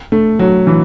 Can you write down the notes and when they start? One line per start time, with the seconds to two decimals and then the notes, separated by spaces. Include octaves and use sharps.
0.12 A3
0.39 F#3
0.67 E3